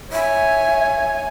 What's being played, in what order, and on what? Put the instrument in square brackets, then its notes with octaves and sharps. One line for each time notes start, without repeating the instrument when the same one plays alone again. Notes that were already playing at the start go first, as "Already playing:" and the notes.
[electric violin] C#5 G#5 [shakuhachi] E5